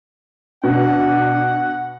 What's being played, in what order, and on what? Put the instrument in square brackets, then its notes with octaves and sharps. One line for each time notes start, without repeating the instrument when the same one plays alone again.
[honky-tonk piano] B2 [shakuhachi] D4 [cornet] F#5